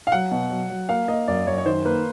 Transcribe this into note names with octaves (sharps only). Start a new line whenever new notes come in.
F5
F#3 F#5
B2
F#3
F#3
A#3 F5
A#3 D#5
F#2 D5
F#2 C#5
C#5
D#3 C5
A#3 B4